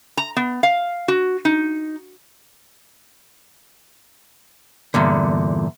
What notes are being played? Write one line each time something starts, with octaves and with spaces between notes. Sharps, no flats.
A#5
B3
F5
F#4
D#4
E2 G2 A#2 D3